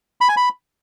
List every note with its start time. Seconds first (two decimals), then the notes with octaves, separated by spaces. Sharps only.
0.21 B5
0.29 G#5
0.37 B5